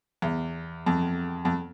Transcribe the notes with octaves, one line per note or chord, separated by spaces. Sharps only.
E2
F2
F2